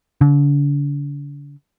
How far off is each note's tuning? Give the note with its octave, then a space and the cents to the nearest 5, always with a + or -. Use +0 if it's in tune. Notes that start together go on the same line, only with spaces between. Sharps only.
D3 -40